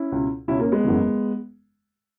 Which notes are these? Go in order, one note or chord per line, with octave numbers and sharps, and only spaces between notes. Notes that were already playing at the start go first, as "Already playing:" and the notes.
Already playing: C#4 E4
C#2 B2
C#2 B2 C#4 E4
A#3 C#4
G#3 B3
F#1 E2 C#3 E3